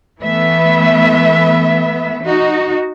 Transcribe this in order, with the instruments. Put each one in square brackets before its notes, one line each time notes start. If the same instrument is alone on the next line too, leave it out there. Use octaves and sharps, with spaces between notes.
[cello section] E3 A3 B3 B4 E5
D#4 F#4